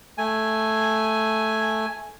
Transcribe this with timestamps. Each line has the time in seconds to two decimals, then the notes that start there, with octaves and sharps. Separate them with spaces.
0.18 A3 G#5